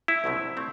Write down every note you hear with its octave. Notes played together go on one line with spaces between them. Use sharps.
E4
C2 B2 F#3 C4
A3 C4